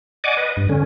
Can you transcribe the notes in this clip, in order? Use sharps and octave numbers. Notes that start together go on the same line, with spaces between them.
D5 D#5 F#5 G#5 D6
B4 D#5
G2
D3 C#4